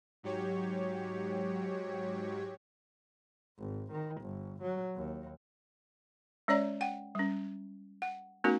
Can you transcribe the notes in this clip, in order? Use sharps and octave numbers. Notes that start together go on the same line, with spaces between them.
G#2 F#3 G4 C#5
G#1
D#3
G1
F#3
D#2
G#3 C#4 C#5 D5 A#5
F#5 G5
G3 C#4
F#5
A3 B3 C#4 D#4 F#4 A#4